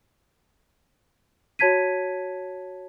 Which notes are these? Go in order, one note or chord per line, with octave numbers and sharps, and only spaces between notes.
F#4 C#5 A5 G#6 B6 D#7